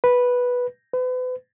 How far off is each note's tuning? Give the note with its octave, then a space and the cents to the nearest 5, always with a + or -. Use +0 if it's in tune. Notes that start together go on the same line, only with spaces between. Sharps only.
B4 -5
B4 +40